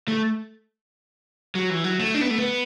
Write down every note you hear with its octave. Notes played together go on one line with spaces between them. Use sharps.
A3
F#3
E3
F#3
A3
D4
B3
A3
B3